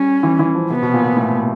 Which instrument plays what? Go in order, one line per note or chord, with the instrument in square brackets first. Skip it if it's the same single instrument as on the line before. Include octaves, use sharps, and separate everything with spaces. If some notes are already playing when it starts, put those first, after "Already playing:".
Already playing: [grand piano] G3 [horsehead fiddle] C#4
[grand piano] E3
E3
F3
[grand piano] C3 [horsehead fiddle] B3
[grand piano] B2
A#2
A#2
A2